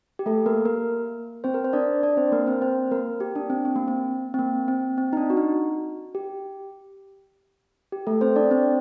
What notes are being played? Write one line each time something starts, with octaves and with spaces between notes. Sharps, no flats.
G4
A3 A4
A#3 A#4
A#3 A#4
C4 C5
A#4
C5
D4 D5
D4 D5
C4 C5
A#3 A#4
C4 C5
C4 C5
A#3 A#4
G4
D4
C4
C4
A#3
C4
C4
A#3
C4
C4
D#4
D4
F#4
D#4
G4
G4
A3 A4
C4 C5
D4 D5
C4 C5